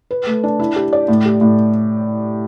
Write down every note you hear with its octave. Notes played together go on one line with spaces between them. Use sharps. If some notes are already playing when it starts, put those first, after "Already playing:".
B4
A3
D4
E4
G4
D5
A2
G4
A2